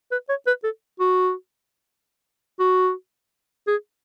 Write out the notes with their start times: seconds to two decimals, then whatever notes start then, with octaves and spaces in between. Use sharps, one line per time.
0.11 B4
0.29 C#5
0.47 B4
0.64 A4
1.00 F#4
2.59 F#4
3.67 G#4